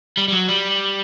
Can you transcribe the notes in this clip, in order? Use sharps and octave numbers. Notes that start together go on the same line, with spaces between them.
G3
G3
F#3
G3